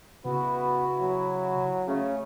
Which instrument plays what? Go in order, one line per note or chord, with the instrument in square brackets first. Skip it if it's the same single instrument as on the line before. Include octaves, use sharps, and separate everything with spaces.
[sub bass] C#3 [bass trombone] B3 [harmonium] E4 F#4
[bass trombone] F#3
[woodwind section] C#3 A3 [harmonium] C#4